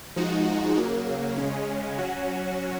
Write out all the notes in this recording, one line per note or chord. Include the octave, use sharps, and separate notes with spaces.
F3 G#3 D#4 F#4
C#3 F#3 A#3
C#3 G#3 C#4
F#3 C#4 F#4